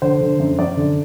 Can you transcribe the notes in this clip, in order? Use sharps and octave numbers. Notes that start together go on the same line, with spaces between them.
D3 C5
D3
F#2
F#2 D5
D3